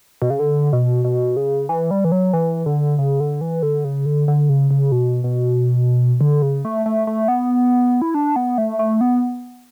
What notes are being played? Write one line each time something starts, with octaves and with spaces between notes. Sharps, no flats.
B2
C#3
D3
B2
B2
C#3
E3
G3
E3
F#3
E3
D3
C#3
D3
E3
D3
C#3
D3
D3
C#3
C#3
B2
B2
D3
C#3
A3
A3
A3
B3
E4
D4
B3
A3
A3
B3